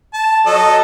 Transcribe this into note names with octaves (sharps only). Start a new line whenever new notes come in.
A5
F#3 A4 D#5